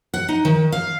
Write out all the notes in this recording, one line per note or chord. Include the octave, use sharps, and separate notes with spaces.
F#5
D#4
D#3
F5